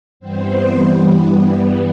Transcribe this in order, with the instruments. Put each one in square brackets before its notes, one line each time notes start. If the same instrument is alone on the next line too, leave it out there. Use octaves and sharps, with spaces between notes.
[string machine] G2 E3 G3 B3 C4 C5